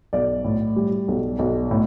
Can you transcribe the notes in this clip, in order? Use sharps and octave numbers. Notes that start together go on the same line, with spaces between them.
B1 D5
A2
G3
B1
B1
A2